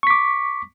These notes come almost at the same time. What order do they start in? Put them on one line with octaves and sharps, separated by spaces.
C#6 B6 D6